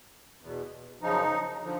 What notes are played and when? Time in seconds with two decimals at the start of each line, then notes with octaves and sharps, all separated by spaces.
0.41 E2 B2
1.02 F#2 C#3 F3 D#4
1.63 D3 F3